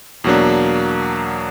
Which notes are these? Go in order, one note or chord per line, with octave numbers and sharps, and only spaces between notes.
E2 B2 F#3 A#3 D4